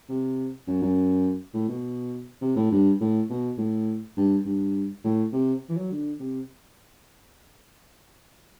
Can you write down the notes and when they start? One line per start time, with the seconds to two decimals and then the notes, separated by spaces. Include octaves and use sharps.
0.09 C3
0.67 F#2
0.82 F#2
1.54 A2
1.69 B2
2.41 C3
2.56 A2
2.71 G2
3.01 A2
3.30 B2
3.58 A2
4.17 G2
4.45 G2
5.04 A2
5.32 C3
5.69 E3
5.76 F#3
5.92 D3
6.20 C3